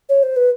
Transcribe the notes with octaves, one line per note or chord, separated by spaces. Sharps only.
C#5
C5
B4